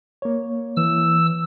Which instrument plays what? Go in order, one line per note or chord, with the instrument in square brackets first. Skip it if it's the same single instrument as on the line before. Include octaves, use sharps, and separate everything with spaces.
[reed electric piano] A#3 C#5
[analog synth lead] E3 [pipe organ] E6